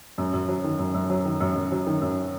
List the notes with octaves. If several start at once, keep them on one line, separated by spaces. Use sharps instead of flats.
F#2
F#2
F#3
D#3
F#2
F#2
F#3
D#3
F#2
F#2
F#3
D#3
F#2